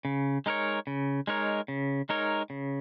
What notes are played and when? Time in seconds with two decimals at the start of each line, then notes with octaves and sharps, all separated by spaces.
0.05 C#3
0.46 G#3 D#4 A#4 C#5
0.87 C#3
1.27 G#3 D#4 A#4 C#5
1.68 C#3
2.09 G#3 D#4 A#4 C#5
2.50 C#3